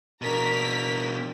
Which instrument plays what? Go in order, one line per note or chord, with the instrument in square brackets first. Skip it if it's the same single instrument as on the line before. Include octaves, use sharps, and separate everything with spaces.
[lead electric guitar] B2 D4 [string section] A#4 A#5 B6